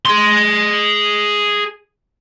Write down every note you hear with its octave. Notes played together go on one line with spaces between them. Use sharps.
G#4 C6